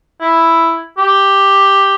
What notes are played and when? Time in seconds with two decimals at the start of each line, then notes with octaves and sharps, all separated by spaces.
0.21 E4
0.98 G4